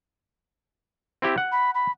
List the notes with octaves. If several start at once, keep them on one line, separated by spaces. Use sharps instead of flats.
C4 E4 G4
F#5
B5
B5